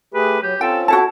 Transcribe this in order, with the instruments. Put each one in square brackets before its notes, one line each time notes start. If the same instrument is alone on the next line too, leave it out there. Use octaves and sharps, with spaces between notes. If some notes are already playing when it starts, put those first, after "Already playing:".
[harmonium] A3 G4 G#4 [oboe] B4
[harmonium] F#3 [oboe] G4
[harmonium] C4 C#4 F4 [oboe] A4 [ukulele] G5
[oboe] E4 [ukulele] F#4 A4 A5